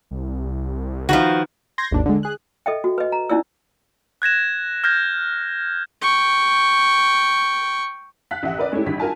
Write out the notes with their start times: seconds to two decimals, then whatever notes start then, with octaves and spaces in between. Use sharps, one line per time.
0.11 C2
1.09 D#3 F3 F#4 B4 F5
1.78 C6 G6 G#6 A#6
1.91 G#1 D#2 D4
2.06 D3 G#3
2.23 G#4 F#6
2.66 A4 D#5 E5 G5
2.84 F#4
2.98 B4 D#5
3.12 A#5
3.29 C#4 D#4 E4 D5 E6
4.22 F#6 G#6 A#6 E7
4.84 F6 G6 G#6 A#6
6.02 G5 C#6
8.31 F5 F#5 F#6 B6
8.43 A1 F2 G4 E5 F#5
8.58 A#4 B4 D5 D#5
8.72 G#3 A3 C#4 D#4 E4 G4
8.86 G#1 G2 G3 B6
9.00 F4 F#4 A#4 G#5 A5